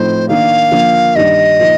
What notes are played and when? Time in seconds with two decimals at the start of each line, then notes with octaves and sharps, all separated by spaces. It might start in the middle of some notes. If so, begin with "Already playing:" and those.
Already playing: A2 F3 C4 D#4 C5
0.28 D#3 A#3 D4 F5
0.72 D3 F3 A#3
1.16 G2 D#3 G3 D4 D#5
1.59 A#2 F3 A#3 D#4